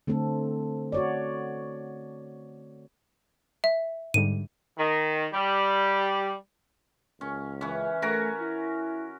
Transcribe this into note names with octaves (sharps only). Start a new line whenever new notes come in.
D3 A3 C4 A4
F#4 C#5 D5
E5
G#2 D3 G3 D#7
D#3
G3
C#2 C#4
E3 C#4
A3 C#4 F#4 A#4
E4